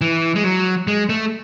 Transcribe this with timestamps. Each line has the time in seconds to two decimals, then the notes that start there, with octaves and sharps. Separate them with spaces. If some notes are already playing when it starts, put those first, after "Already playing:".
0.01 E3
0.35 G#3
0.44 F#3
0.87 G#3
1.09 A3